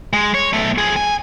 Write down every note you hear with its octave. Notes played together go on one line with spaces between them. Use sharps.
G#3
C#5
B1 A3
F3 G#4
G#5